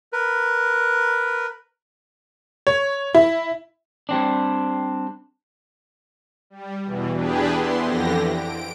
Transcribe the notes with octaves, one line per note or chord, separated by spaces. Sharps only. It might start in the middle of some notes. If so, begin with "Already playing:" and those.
A#4 B4
C#5
E4
G3 C4 D4
G3
E2 B2 E3
E2 D4 G4 G#4 B4
B3 E4 C6
F2 D3 E3 G4 A#6
D7